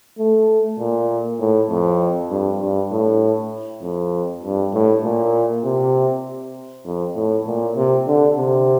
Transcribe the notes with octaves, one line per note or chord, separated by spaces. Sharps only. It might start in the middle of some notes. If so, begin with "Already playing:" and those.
A3
A#2
A2
F2
G2
G2
A2
F2
G2
A2
A#2
C3
F2
A2
A#2
C3
D3
C3